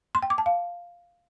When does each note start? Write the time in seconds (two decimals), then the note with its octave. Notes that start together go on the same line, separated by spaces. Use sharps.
0.15 C6
0.22 G5
0.30 D6
0.38 A5
0.46 F5